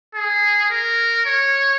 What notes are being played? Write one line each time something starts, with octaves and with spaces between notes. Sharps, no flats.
G#4
A#4
C#5